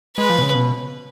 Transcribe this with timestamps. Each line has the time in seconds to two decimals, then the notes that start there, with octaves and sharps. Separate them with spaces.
0.17 G#3 B4
0.30 F3
0.38 B2
0.42 C#3
0.55 B2